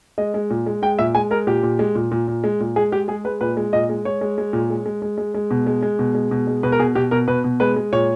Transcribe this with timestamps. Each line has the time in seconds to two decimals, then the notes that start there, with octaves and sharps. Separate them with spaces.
0.18 G#3 D#5
0.34 G#3
0.50 A#2
0.67 G#3
0.82 G#3 G5
0.99 A#2 E5
1.15 G#3 G#5
1.31 G#3 A#4
1.47 A#2 G4
1.63 A#2
1.79 G#3
1.95 A#2
2.11 A#2
2.28 A#2
2.44 G#3
2.60 A#2
2.76 G#3 G#4
2.92 G#3 G4
3.08 G#3 G#4
3.25 G#3 B4
3.41 A#2 B4
3.57 G#3
3.73 A#2 D#5
3.89 G#3
4.05 G#3 C#5
4.21 G#3
4.38 G#3
4.53 A#2
4.70 G#3
4.86 G#3
5.02 G#3
5.18 G#3
5.35 G#3
5.51 B2
5.67 G#3
5.83 G#3
5.99 B2
6.15 G#3
6.31 B2
6.47 G#3
6.63 B2 B4
6.72 A#4
6.79 B2 G#4
6.95 B2 G4
7.11 B2 A#4
7.28 B2 B4
7.44 B2
7.60 G#3 B4
7.76 G#3
7.92 A#2 C#5